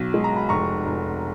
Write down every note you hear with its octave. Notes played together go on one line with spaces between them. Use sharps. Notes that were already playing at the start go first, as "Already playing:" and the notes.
Already playing: B1
G#3
A#5
B5
F1 A#5 C#6
F1